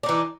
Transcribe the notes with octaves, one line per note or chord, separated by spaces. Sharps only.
E3 D4 D#4